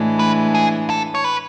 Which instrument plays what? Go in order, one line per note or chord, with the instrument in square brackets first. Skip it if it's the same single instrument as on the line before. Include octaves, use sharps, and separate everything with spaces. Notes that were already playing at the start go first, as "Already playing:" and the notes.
Already playing: [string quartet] A2 E3 G#3 D4
[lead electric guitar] B4
G#4
A4
C#5
B4